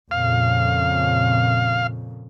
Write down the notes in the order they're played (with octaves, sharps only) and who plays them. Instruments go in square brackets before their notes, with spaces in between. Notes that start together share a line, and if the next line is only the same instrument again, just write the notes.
[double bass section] F2 A#2 C#3 [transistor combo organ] F5